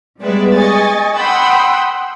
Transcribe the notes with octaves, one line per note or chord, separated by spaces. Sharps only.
G3 G#3 B3 B4 D5 E5
D#5 G#5 C#6 A6
F#5 G5 B5 C6 D#6 E6